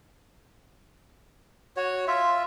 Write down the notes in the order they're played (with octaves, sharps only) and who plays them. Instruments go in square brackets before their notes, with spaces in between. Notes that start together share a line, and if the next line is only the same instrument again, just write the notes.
[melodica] F#4 C#5
F4 E5